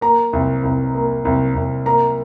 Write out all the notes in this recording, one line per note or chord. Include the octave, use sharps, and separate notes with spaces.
A#3 A#5
C2
C2
A#3
C2
C2
A#3 A#5